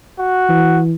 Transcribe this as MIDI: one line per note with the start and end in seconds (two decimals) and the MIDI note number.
0.19 0.81 66
0.49 0.95 52